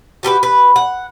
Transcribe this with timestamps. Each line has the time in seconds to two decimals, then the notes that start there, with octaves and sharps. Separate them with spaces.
0.23 F#4 G4 A4 B4
0.43 B4
0.76 F#5